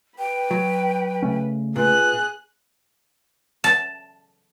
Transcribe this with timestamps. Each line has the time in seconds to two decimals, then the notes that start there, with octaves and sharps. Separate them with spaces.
0.19 B4 G5
0.51 F#3
1.22 C#3 A3 C#4
1.76 A#2 G#4 B4 F#6
3.64 A5